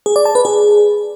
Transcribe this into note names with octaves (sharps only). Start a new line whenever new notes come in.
G#4
D5
A5
B4
G#4